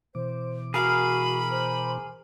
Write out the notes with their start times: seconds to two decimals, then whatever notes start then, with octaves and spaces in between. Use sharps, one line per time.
0.15 B2 E3 C5 D6
0.74 F#4 G#4 A#4 F5 B5
1.51 C5